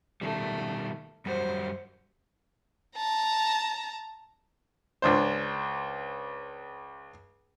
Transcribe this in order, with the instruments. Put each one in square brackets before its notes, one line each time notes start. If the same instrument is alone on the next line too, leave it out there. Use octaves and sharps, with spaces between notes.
[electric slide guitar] B2 D#3 G3 [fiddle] A3
[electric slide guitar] F#2 G3 F#4 [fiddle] C5
[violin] A5 A#5
[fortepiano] C#2 D4 C5